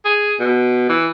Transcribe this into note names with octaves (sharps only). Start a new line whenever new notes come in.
G#4
B2
E3